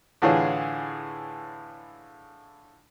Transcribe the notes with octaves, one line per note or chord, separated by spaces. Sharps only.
A2 D3 E3 F4 G#4 C#5